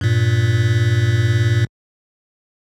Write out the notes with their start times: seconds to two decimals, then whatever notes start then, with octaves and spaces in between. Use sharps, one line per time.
0.01 G2 A#2